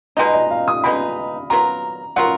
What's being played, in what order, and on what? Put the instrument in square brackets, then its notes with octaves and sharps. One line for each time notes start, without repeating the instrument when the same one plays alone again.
[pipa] B2 G#3 B3 D#4 [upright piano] D#5
[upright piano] D#5
F5
D#6
[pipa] B2 G#3 B3 D#4 [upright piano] B5
[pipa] F#3 B3 F4 A#4 [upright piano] A#5
[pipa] F#3 B3 F4 A#4 [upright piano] F#5